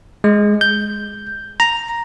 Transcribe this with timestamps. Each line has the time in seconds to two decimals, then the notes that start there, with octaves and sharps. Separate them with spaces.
0.24 G#3
0.61 G6
1.60 A#5